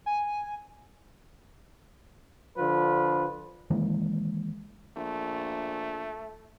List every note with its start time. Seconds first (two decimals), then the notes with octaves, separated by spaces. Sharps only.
0.06 G#5
2.58 D3 F3 F4 B4
3.70 D#3 E3 G#3 A#3
4.96 A#1 A3